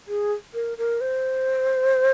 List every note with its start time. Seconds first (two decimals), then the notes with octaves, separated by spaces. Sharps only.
0.08 G#4
0.54 A#4
0.78 A#4
1.01 C5